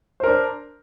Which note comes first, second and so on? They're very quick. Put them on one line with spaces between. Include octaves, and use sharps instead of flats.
C5 A#4 D4